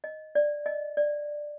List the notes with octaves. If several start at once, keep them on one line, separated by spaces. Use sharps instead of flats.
D#5
D5
D#5
D5